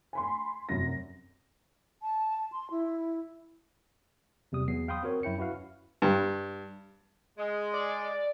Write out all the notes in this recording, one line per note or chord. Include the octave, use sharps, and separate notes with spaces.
G#5 B5 C6
F1 F#2 A#6
A5
C6
E4
E2 C3 G3 D#6
E2 F#3 B3 C7
F5 G5 B5 C6 D#6
C4 F#4 A#4 C#5
F#2 E4 G5 C#7
C#4 E4 F#4 B4 F5
G2
G#3
D5